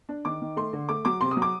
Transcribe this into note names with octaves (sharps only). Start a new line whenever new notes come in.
D4
D#3 D6
D#3
A3 C6
D3
A3 D6
F#3 D6
C3 C6
D#6
F#3
D6